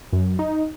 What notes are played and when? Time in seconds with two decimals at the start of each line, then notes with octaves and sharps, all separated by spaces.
0.13 F#2
0.39 D#4